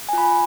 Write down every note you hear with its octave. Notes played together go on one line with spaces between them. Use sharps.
F4 G#5 B5